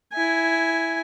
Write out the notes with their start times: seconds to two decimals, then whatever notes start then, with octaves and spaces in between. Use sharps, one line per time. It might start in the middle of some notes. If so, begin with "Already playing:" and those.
0.13 E4 G#5